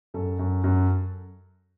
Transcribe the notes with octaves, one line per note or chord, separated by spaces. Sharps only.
F#2 A4
F#2
F#2